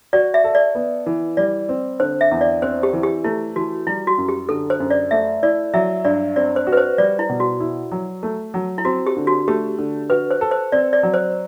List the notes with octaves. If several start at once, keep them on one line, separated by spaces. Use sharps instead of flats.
F#4 D5
E5
A4
D5
B3
E3
G3 D5
C4
D3 C5
E5
E2
D5
C4 C5
G4
E3
G4
A3 E4
E3 F#4
G3 E4
F#4
F#2
G4
D3 A4
C5
F#2
D5
A3 E5
E4 D5
F#3 E5
G2 D5
C4 D5
C5
F#4
B4
C5
G3 D5
E4
B2
F#4
E4
F#3
A3
F#3
E4
C4 F#4
G4
D3
F#4
A3 G4
D3
F#4 B4
C5
A4
C5
C4 D5
D5
F#3
C5